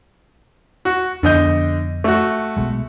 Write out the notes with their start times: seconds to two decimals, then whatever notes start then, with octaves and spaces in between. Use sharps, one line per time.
0.85 F#4
1.23 F2 D3 F3 B3 D#5 G6
2.04 A3 F#4
2.57 B1 B2 G#3